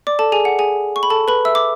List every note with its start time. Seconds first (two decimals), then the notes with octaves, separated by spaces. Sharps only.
0.07 D5 D6
0.19 A4 A5
0.32 G#4 G#5
0.45 F#5
0.59 G#4 G#5
0.96 C#6
1.03 B5
1.10 A4 A5
1.28 B4 B5
1.45 E5 E6
1.55 D6